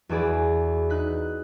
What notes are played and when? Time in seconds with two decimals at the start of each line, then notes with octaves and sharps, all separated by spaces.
0.09 E2 F#4 G#4 D5 B5
0.90 D#4 F#6 B6